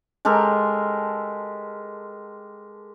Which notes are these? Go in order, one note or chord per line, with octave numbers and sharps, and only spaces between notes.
G#3 G4 A4 A#4